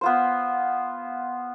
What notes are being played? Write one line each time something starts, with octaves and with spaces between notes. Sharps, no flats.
B3 F4 C5